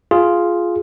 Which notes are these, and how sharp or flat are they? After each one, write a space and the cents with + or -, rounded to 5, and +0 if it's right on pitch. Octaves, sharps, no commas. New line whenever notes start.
F4 +0 G#4 +10